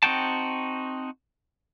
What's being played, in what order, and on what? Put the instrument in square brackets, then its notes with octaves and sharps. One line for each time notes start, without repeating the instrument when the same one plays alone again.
[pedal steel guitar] C4 D#4 F#4 G5 A5